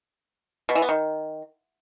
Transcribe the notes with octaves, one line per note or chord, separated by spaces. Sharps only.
B2
E3
B3
D#3